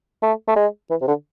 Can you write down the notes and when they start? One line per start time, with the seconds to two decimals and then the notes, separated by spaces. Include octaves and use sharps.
0.22 A3
0.48 A3
0.56 G#3
0.90 E3
1.01 C3
1.08 D3